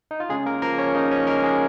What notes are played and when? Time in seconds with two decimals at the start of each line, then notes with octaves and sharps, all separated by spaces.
0.11 D#4
0.20 F4
0.29 C#3 G#3 G#4
0.46 A#3 A#4
0.62 F3 A#3 A#4
0.78 C#4 C#5
0.95 C#3 D#4 D#5
1.11 C#4 C#5
1.27 G#3 A#3 A#4
1.43 G#3 G#4